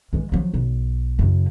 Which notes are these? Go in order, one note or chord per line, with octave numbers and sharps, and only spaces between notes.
E3 G#3
F3 F#3
B1
F#2 C#3